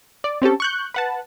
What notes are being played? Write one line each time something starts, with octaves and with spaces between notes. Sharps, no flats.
D5
C4 C#4 G4 A4
C#6 F#6 G6
B4 F#5 A5